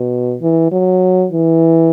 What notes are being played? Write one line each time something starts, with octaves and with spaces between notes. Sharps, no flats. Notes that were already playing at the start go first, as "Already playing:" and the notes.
Already playing: B2
E3
F#3
E3